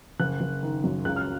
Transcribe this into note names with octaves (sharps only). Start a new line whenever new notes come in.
F#1 F#6
F#1
D#3
F#2
C#2 F#6
F6